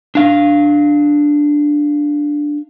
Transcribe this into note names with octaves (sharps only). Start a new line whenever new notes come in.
D4 F5